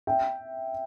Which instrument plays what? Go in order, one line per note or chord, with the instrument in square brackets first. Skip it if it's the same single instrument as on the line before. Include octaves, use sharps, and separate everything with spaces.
[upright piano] E5 G5